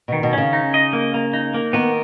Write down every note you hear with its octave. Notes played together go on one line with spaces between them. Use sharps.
B2 D#3
B2
C#3 C#4
D#4
D#5
A#3
A#3
D#4
A#3
D#3 B3